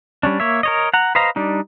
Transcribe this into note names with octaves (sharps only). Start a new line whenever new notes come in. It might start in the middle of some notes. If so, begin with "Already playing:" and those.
G3 C#4 D4
A#3 C#5 E5
A#4 C#5 D#5
F#5 A#5
B4 C5 D#5 F5 A#5
G3 D4 D#4